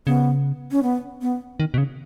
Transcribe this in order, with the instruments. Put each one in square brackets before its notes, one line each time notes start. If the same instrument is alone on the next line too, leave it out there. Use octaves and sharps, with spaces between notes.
[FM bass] C#3 [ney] B3
[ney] C#4
B3
B3
[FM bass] D#3
B2
C#3